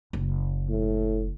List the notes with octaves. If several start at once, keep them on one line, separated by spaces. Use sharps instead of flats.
F#1
A2